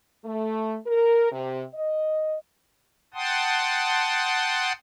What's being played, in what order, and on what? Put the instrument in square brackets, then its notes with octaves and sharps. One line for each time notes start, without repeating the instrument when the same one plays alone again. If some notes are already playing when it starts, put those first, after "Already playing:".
[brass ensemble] A3
A#4
C3
D#5
[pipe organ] F#5 G5 A5 C6 D#6